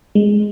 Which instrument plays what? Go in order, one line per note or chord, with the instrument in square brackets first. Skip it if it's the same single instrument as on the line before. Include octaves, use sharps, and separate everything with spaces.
[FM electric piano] G#3